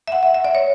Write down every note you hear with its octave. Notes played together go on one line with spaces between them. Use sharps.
E5
F#5
E5
E5
D5
C#5